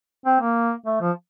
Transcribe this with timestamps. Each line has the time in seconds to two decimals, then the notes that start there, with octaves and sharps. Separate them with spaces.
0.26 C4
0.41 A#3
0.86 A3
1.01 F3